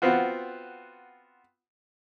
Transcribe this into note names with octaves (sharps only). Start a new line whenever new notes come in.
B3 C4 F4 F#4